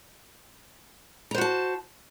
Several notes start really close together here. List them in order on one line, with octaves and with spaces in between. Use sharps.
A#5 C5 F#4 A5